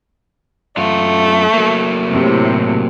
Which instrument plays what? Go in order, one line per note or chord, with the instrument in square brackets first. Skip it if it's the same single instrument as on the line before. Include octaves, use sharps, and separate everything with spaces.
[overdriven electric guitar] F#2 F4 [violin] A3
[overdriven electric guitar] F#3 A#3
[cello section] A2 C3